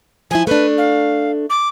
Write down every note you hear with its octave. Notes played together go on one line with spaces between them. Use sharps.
F3 E4 G#5
A3 D4 B4
F5
D6